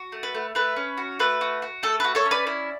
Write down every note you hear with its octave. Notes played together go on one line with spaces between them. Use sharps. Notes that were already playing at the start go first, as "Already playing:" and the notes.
Already playing: F#4
A3
B4
A3
A3 B4
C#4
F#4
A3 B4
F#4
F#4
A3 A4
F#4 B4
A4 C#5
C#4
B4 D5
E4